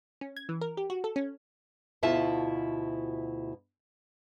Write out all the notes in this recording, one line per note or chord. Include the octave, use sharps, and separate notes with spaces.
C#4
G#6
E3
A#4
G4
F#4
A4
C#4
D2 B2 E4 F4 E5 A5